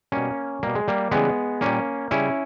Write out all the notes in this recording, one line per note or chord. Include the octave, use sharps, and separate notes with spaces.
B2 G3 A#3 C#4
B2 G3 A#3
G#3
G3 A#3
C#3 E3 G3 G#3 B3
A#2 G3 A#3 C#4
C#3 G3 C#4 E4